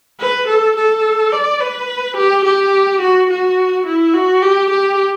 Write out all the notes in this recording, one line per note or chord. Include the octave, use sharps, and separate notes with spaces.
B4
A4
A4
D5
B4
G4
G4
F#4
F#4
E4
F#4
G4
G4